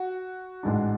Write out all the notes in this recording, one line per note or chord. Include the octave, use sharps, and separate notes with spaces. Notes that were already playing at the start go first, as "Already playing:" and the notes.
Already playing: F#4
A1 G#2 G#3 D4